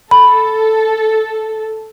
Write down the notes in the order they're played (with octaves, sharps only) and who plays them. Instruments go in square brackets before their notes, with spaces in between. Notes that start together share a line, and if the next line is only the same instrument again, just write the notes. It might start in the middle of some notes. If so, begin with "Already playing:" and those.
[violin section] A4 [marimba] B5